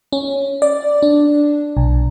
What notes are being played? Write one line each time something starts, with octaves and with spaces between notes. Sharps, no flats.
C#4
D5
D4
B1